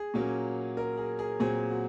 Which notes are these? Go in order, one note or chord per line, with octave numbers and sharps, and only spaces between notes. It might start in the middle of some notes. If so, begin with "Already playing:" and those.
Already playing: G#4
A#2 F#3 A#3 C#4
A#4
G#4
G#4
A#2 F#3 C4 G#4
F#4